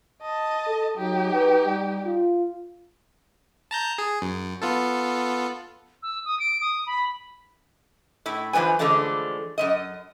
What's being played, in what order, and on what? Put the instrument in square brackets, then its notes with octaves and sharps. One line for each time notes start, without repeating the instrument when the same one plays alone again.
[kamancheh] D#5 A5
[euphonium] A4
[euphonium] F#3 [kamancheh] D#4 G4
[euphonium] B4
G3
F4
[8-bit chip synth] A5 A#5 G6
G#4
F#2
B3 F4 A4
[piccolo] E6
D#6
D7
D#6
B5
[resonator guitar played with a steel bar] A2 E4
E3 F3 G3 B4 G#5
D3 E3 F3 G#3 A3 D4
F#2 F3 D#5